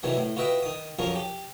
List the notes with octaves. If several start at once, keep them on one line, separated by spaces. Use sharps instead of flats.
C3 D#3 E3 F#3
A2
F4 F#4 B4 D#5 E5 G5
D#3 D#6
F2 F3 F#3 C#4 A#4
G4